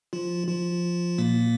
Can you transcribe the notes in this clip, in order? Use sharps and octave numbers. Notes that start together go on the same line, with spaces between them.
F3 F4
F3 F4
A#2 A#3